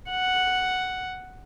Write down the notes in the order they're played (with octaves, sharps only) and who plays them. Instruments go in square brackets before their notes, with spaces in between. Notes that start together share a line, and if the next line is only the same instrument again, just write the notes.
[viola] F#5